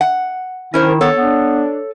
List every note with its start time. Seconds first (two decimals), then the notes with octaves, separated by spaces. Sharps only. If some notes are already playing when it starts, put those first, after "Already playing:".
0.01 F#5
0.74 D#3 C#4 E4 A#4 C5
1.01 B3 A4 C#5
1.16 B3 D4